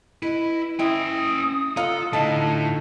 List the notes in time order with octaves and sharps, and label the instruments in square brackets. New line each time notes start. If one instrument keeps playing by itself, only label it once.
[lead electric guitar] E4 [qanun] B4 [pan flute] D#5
[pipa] G#3 [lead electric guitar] C#4 G5 [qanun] E4 [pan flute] D#6
[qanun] F4 F#5 [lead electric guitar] A4 [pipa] D#5 F5 A#5
[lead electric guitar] A2 [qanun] D3 D#4 [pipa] A5